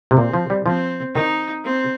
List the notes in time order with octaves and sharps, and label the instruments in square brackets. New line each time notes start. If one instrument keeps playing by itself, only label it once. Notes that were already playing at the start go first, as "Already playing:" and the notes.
[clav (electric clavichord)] C3
[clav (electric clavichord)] A#2 [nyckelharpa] C4
[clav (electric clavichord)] F3
G3
[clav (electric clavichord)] F3 [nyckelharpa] C4
[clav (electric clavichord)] D#3 [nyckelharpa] D#4
[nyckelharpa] C4